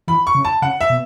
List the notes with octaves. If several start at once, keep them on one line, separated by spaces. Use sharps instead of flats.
E3 B5
C#6
C#3
A5
C#3 F#5
E5
B2